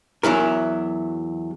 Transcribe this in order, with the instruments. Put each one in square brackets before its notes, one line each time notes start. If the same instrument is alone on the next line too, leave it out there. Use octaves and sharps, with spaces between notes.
[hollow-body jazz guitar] E2 F#3 E4 A#4